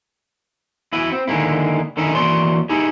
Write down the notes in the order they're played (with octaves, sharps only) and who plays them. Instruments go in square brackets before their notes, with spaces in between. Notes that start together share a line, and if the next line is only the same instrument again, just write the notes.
[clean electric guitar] E4 F#4 B4
C4
D3 D#3 F#3 G#3 A#3 E4
D3 D#3 C#4 D#4 E4
E3 A#3 F#4 C#5 D5 C6
D#4 E4 G4 G#4